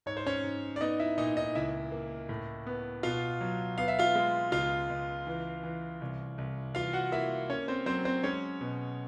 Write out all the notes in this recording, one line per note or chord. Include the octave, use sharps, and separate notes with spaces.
G#2 C#5
C5
C#4 C#5
G#2
D5
B3 D#4 D#5
E4 E5
A#2 D#4 D#5
D#4 D#5
C#2 E4 E5
A#3
A2
B3
B2 F4 F5
F#3
B3 F5
E5
F4 F5
G#3
C#2 F4 F5
C#2
E3
E3
C2
C2
E3 F4 F5
F#4 F#5
A#3 E4 E5
A#3 C#4 C#5
C4 C5
F#3 C4 C5
C4 C5
G#3 C#4 C#5
B2